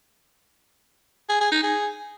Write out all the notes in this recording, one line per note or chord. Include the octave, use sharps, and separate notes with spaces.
G#4
G#4
D#4
G#4